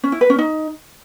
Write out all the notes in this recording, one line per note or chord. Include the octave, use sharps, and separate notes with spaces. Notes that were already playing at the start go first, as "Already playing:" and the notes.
C#4
E4
B4
C#4
D#4